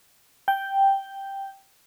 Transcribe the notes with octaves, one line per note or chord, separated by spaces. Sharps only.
G5